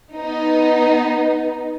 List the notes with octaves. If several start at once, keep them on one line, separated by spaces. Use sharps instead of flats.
B3 D#4